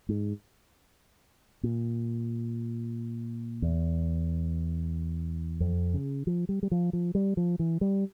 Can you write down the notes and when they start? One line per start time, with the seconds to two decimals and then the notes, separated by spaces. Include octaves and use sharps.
0.09 G#2
1.63 A#2
3.62 E2
5.60 F2
5.94 C#3
6.27 F3
6.49 G3
6.63 G3
6.71 F3
6.93 F3
7.15 G3
7.37 F3
7.59 E3
7.81 G3